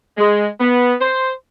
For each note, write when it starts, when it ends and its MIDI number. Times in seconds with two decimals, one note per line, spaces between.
0.17 0.47 56
0.60 0.93 59
1.00 1.31 72